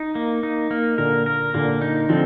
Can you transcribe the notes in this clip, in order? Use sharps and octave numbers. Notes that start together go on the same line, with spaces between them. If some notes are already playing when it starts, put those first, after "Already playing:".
Already playing: D#4
A#3
D#4
A#3
A#2 D3 A#4
A#4
A#2 D3 A#3
D#4
D3 F3 C4